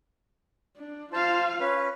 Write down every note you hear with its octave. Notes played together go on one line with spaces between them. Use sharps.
D4
F4 C5 F5 A5
C#4 B4